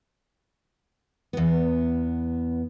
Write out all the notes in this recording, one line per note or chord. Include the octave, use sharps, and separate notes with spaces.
E2 B3